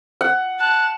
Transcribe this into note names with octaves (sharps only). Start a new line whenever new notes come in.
F#5
A5 F#6